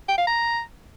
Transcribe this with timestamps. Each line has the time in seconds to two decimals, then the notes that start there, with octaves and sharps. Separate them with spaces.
0.09 G5
0.18 F5
0.27 A#5